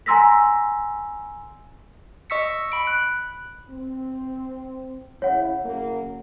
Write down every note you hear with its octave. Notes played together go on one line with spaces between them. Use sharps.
G#5 A#5 C6 E6 A#6 B6
D#5 C#6 E6 B6 C#7
B5 D7
F#6
C4
C#3 E4 C#5 F#5
C#3 F#3 A#3